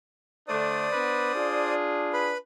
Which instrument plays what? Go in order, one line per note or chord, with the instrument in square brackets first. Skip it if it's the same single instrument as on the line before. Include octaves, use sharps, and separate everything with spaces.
[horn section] D3 A3 D4 [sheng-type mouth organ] C5 D5 D#6
[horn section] B3 D4 B4
D4 F4 G#4
[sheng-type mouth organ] B4 B5